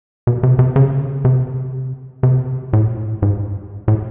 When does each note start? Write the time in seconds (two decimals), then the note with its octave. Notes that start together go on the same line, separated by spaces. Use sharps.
0.27 B2
0.43 C3
0.59 C3
0.76 C#3
1.00 D3
1.13 C#3
1.25 C3
2.23 C3
2.73 A2
2.86 A#2
2.97 A2
3.22 G#2
3.88 A2